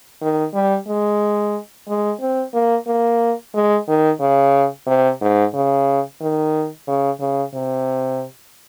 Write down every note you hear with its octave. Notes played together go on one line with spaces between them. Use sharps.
D#3
G3
G#3
G#3
C4
A#3
A#3
G#3
D#3
C#3
C3
G#2
C#3
D#3
C#3
C#3
C3